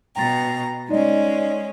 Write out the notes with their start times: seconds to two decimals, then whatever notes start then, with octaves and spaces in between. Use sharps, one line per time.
0.16 B2 G5 A#5 A6
0.89 G#3 C#4 D#4 D5 D#5